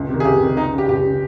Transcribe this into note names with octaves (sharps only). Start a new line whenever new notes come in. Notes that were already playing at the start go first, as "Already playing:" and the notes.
Already playing: C#2
C3 D#3
G#4
C#2 G4
C3 D#3
C#2 D#4
C#3
G4
C#2 G4
C#3